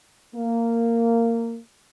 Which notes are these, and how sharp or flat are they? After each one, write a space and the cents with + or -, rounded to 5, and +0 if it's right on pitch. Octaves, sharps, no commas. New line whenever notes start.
A#3 -15